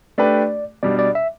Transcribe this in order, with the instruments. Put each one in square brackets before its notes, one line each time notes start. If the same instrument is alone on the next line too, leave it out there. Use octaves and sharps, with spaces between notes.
[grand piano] A3 D4 G4 B4 [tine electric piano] D5
[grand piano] B2 G3 D4 [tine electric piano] D5
[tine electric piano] D5
E5